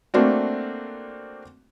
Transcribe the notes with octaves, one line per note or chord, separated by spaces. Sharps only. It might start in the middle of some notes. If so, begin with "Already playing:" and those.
A3 A#3 C4 D4 F#4